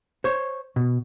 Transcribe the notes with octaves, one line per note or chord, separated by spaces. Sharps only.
C5 C#5
B2